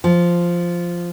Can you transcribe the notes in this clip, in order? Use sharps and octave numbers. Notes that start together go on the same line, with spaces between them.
F3